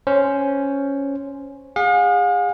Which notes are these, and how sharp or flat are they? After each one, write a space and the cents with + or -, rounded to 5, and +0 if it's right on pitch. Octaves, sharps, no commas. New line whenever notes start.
C#4 +0 C5 +0
G#4 -30 F5 +45